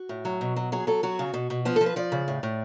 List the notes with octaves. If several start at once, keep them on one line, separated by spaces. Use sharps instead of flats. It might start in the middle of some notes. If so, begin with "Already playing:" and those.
Already playing: F#4
A2
F#3
B2
F#3
F#3 G#4
F#3 A4
F#3 F#4
C#3
B2
B2
F3 B3
A4
F3
B4
F3 D5
C#3
A2
A2